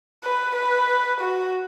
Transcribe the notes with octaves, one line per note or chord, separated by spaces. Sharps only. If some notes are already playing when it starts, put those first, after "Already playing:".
B4
B4
F#4